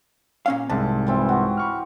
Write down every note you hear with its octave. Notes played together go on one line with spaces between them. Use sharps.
A#2 C#4 F5
C2 G#2 C3 A5
E3 C4 F4
F#4 G4
B5 C#6 F6